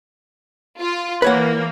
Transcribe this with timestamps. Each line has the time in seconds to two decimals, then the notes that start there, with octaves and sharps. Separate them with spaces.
0.79 F4
1.22 E3 A#3 B4 C#5 F#5